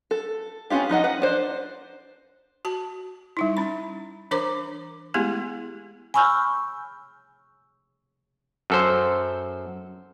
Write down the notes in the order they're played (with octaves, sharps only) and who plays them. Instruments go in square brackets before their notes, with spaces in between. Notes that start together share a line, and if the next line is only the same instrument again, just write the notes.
[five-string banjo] A4
B3 C#4 E4 F4 G4
F3 D#4 D#5 F#5
B4 F#5
D4 C5
[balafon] F#4 A5
G3 D#4 E4
C#4 B5
E3 D4 A#4 C5 A#5 D6
G#3 A3 B3 E4 G4 G#4
[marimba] G#5 B5 C#6 E6 F6 G6
[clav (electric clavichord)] F#2 A4 C5